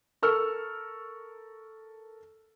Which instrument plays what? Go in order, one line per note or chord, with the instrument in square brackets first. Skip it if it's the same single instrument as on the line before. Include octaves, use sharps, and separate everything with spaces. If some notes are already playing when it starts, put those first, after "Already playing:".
[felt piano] A4 A#4 C#6 E6 F6